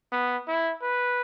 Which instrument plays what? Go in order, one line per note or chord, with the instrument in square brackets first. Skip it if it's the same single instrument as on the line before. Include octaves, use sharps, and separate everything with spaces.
[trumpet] B3
E4
B4